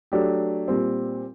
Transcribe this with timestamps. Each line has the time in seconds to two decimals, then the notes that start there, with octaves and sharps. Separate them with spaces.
0.12 F#3 A3 D4 G4
0.68 A#2 G3 C4